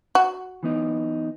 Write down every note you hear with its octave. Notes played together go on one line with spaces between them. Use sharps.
F#4
E3 B3 D#4